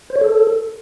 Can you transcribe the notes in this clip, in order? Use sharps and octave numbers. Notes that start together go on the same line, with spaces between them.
C5
C#5
A4